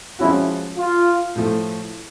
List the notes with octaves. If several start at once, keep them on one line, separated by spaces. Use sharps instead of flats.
F3 G#3 C#4 E4 F#4
F4
A2 F3 A3